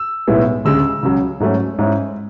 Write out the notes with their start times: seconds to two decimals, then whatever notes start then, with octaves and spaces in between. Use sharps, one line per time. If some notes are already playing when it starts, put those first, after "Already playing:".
Already playing: E6
0.28 B1 A2 G#3 B3 E4
0.65 D2 C#3 G#3 E6
1.03 C#2 C#3 F#3
1.40 G#2 F#3 A3 C#4
1.78 G#2 G#3 C#4 E4